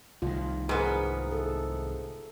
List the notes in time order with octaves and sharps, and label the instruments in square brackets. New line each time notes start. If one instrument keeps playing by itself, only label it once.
[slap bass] C2 D#3 [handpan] F4
[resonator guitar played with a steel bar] G#2 B3 [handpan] G#4 A#4
[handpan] A4